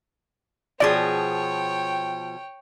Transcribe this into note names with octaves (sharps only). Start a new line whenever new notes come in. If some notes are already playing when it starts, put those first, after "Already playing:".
B2 F3 G#4 C#5 D5 G5